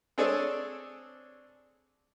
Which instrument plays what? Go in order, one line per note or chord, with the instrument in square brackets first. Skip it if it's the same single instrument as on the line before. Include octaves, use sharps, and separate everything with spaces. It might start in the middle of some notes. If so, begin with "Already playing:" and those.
[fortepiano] C4 D4 G#4 A4 C#5 D5